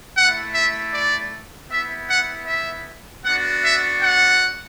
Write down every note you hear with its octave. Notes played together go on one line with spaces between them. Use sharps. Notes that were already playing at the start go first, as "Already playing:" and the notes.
A3 E4 F#5
E5
D5
B3 E4 E5
F#5
E5
B3 D4 F#4 F#5
E5
F#5